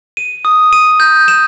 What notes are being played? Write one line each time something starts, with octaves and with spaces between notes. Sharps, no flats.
D#7
D#6
D#7
G6
E7